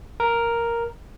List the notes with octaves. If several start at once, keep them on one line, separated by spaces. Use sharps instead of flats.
A#4